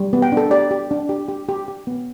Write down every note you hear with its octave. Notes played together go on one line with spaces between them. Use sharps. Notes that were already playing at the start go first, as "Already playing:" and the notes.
Already playing: G3
B3
G5
D4 A4
G4 D5
G4
D4
G4
G4
G4
G4
B3